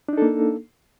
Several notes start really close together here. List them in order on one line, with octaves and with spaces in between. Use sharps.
D4 D#4 A4 A#3